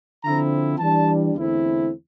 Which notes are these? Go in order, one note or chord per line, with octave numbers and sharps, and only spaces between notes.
D3 F3 C4 E4 A#5
E3 G3 D4 A5
E2 D3 A3 C4 E4